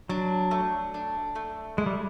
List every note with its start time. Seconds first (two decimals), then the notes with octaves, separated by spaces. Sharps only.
0.09 F#3 D4
0.51 A3
0.94 D4
1.35 A3
1.78 G#3 E4
1.86 G3